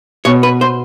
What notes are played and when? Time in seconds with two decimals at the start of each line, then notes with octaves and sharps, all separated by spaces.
0.25 B2 C#5
0.43 B4
0.61 C5